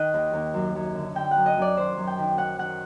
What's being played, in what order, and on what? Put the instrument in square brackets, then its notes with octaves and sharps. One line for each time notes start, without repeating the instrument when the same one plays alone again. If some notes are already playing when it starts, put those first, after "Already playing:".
Already playing: [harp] D#3 D#5 F#5
D#2
D#2
F#2
F#2
D3
D3 G5
F#2 F#5
D#5
F#2 D5
D#3 C5
F#2
G5
D#3
D#3 F#5
D#3 F#5